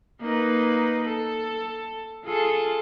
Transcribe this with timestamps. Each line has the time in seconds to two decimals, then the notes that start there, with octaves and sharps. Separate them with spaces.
0.21 A#3 D#4 B4
1.05 A4
2.25 F4 G#4 A4